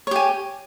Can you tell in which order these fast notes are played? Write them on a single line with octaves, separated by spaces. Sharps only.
C#5 G4 G#5